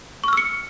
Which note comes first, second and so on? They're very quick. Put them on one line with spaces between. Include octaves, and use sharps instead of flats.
C#6 F6 E6 C#7